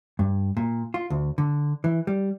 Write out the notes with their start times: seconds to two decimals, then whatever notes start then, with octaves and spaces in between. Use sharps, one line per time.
0.19 G2
0.57 A#2
0.94 F4
1.10 D2
1.38 D3
1.84 E3
2.07 G3